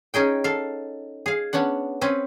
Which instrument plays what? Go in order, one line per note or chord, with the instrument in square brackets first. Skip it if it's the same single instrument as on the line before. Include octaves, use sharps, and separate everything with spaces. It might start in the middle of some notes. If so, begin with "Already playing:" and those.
[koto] C#4 D#4 G#4 G5
A4 F5
G#4 F5
B3 C#4 D4 F#5
C4 C#4 B4